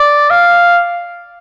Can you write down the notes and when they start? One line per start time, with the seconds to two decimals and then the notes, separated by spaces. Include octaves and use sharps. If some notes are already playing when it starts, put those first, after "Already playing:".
Already playing: D5
0.30 F5